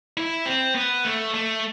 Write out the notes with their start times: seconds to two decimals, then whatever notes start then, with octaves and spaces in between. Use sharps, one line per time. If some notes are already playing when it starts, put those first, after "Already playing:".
0.17 E4
0.46 C4
0.75 B3
1.05 A3
1.34 A3